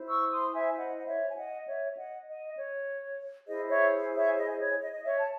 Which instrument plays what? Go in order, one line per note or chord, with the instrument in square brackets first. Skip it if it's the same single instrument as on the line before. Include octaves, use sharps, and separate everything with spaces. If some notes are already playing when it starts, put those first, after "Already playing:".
Already playing: [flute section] E4 C5
C#6 E6
C6 D#6
E5 G#5
D#5 F#5
F#5
C#5 E5
G#5
D#5 F#5
C#5 E5
D#5 F#5
D#5
C#5
E4 G#4 C5 D#5
C#5 E5
C#5 E5
D#5
D#5
C#5
D#5
D#5
C#5 E5
A5